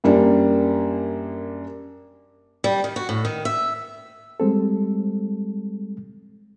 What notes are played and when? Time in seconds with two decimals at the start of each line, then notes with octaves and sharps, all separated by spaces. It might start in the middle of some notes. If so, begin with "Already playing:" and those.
0.04 F#2 G3 A#3 D4
2.64 G3
2.84 D#3
2.96 F#4
3.09 A2
3.25 D#3
3.45 E5
4.40 G3 G#3 C4 A4